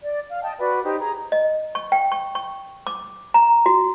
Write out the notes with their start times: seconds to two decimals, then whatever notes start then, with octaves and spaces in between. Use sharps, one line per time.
0.03 D5
0.30 F5
0.43 D#5 G5 A5
0.59 F#4 B4 D5
0.84 D#4 G4 C5
0.99 G#4 A#5
1.32 D#5
1.75 C#6
1.92 G5
2.12 C#6
2.35 C#6
2.87 D6
3.34 A#5
3.66 F#4